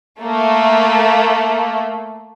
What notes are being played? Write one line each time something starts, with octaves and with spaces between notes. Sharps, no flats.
A3 A#3